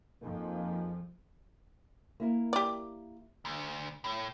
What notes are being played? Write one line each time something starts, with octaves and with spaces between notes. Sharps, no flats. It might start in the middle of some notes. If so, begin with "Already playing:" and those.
F2 F3 A#3 D#4 G#4
A#3 E4 A#4
G4 D5
D2
A2